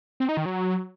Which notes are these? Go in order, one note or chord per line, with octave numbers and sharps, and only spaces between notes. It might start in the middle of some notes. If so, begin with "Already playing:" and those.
C4
D#4
D#3
F#3